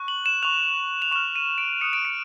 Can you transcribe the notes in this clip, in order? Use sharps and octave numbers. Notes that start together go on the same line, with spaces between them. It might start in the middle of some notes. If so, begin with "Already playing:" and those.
Already playing: C#6 F#6
F#7
E7
C#6 F#6 F7
F7
C#6 F6 E7
D#7
D7
D#6 F#6 C#7
D7
C#7